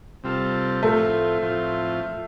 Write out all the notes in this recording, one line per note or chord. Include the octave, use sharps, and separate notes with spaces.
C3 G3 C4 F4 A4
A2 F3 A3 C4 F4
A2 F3 C4 F4